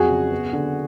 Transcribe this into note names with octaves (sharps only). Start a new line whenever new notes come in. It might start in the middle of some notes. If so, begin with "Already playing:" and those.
Already playing: F2 F#3 F#4 G#4
C#3
B3
D3